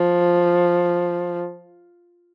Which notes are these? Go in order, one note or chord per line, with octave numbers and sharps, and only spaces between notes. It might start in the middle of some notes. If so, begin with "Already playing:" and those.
Already playing: F3